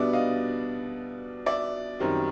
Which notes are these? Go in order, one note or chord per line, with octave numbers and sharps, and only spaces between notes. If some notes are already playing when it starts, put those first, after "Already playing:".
Already playing: B2 G3 B3 D4 D5 E5
D#5 F5
D5 E5
F#2 D#3 G3 C4